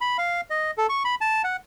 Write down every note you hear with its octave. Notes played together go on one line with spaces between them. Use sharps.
B5
F5
D#5
A4
C#6
B5
A5
F#5